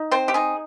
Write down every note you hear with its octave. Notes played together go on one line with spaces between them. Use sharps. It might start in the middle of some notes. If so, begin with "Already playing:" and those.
Already playing: D#4
C4 C5
G4
D#4 G#4